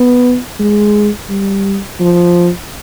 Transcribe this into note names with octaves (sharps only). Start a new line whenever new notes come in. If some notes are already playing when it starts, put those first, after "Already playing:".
Already playing: B3
G#3
G3
F3